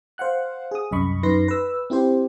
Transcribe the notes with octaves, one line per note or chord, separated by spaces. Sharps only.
C5 F5 F#5 F#6
G#4 D#6
C2 F#2 D#5 B5 C#6
F#2 D#4 B4 C6 A#6
B4 E6
C4 E4 G4 C5